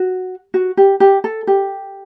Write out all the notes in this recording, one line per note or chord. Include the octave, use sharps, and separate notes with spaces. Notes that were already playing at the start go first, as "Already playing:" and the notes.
Already playing: F#4
F#4
G4
G4
A4
G4